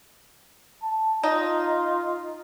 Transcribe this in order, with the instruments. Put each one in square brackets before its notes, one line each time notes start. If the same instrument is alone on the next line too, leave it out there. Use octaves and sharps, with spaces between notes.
[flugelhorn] A5
[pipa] D#4 [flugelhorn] F4